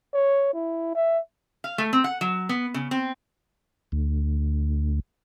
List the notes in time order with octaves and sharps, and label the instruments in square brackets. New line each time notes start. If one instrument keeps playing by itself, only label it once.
[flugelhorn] C#5
E4
E5
[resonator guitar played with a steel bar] F5
A3
C4
F#5
F#3
B3
C#3
C4
[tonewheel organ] D2